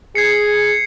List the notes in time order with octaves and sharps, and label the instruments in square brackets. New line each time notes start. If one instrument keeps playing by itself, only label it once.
[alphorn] G#4 [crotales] G#6 C7 C#7